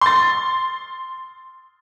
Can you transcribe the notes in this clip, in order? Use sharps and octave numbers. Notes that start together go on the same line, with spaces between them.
C6 A6